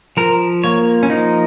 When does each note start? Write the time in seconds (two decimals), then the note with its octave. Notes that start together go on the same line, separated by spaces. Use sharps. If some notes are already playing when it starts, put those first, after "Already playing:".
0.17 F3 A#4
0.64 A#3 C#5
1.03 C#4
1.09 F3 D#4